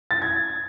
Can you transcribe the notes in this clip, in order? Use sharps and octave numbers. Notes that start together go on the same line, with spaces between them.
A6
G#6